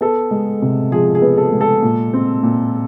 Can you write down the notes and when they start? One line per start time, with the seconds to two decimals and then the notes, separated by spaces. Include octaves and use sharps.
0.01 B3 A4
0.31 G#3
0.62 C3
0.91 F3 G#4
1.15 G#4
1.22 B3
1.37 A4
1.52 G#3
1.61 A4
1.82 A#2
2.13 C4
2.43 A#2